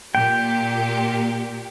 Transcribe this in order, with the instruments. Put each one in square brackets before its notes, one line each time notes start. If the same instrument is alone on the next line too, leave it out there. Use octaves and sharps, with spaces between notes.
[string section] A#2 G4 [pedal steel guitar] G5